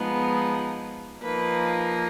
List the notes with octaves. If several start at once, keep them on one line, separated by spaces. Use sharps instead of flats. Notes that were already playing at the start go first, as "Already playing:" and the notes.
Already playing: F3 G#3 B3 D#4
F3 A#3 D#4 B4